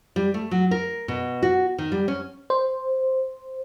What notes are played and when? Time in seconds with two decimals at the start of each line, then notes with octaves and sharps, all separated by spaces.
0.16 G3
0.34 A3
0.51 F#3
0.71 A#4
1.08 B2
1.43 F#4
1.78 D#3
1.92 G3
2.08 C#4
2.50 C5